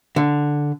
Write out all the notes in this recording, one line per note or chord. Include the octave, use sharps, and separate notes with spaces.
D3